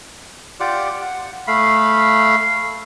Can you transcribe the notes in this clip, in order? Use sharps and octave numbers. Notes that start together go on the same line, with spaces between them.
F4 G4 D5 F#5
F#5
A3 F5 B5